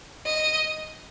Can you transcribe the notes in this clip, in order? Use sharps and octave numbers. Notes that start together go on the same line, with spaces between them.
D#5